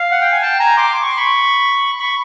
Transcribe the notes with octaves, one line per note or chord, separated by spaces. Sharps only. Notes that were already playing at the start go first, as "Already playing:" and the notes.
Already playing: F5
F#5
G5
G#5
G5 A5
G#5 A#5
C6 D6
D6
C#6
C6
B5 C#6
B5 C#6